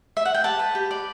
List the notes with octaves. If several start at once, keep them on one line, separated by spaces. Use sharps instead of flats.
E5
F#5
G5
G4 F#5 A5
B4
G4
D5